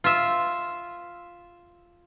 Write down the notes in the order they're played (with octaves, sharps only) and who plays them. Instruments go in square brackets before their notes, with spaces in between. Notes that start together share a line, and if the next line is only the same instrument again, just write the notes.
[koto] F4 E5